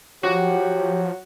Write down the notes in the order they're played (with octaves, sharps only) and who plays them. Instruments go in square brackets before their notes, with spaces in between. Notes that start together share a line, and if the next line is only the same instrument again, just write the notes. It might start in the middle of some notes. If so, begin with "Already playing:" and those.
[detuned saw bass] F3 [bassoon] F#3 [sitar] F#4 [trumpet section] G4